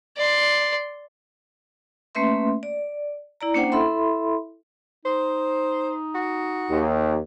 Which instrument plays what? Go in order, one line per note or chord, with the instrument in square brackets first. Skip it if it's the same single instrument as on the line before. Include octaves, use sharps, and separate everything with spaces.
[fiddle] D5 C6
[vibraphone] A3 A#3 C#4 B4 E5 C6
D5
E4 D5 A#5
A#3 C#4 D4 C5 F#5 G5
E4 A4 E5 B5 C6
[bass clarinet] D#4 [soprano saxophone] C5
[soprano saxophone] F#4
[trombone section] D#2